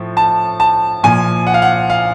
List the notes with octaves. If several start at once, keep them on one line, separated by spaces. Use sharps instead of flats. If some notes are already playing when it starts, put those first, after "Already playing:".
Already playing: A2 F3
A5
A5
A#2 F3 G#5
F#5
F5
F#5
F5